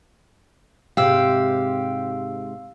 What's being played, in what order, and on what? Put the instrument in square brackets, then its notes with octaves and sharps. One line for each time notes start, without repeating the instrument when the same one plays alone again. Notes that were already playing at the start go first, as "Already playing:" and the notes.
[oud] G#2 C3 [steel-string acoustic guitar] G4 [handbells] F5 E6